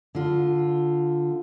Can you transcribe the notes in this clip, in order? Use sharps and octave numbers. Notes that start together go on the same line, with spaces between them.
D3 F4